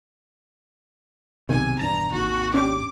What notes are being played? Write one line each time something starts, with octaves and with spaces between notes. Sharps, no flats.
B1 G#2 C3 D#3 G#5
E1 G2 D4 A5 A#5
G#1 D#2 F#4
C#4 D4 G4 D6